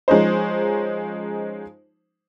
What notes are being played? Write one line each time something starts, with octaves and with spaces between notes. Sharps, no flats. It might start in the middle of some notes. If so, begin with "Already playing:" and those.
F3 G#3 C#4 D#4 C5